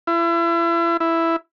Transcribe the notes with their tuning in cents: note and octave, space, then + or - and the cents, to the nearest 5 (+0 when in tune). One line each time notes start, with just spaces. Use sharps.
E4 +35
E4 +5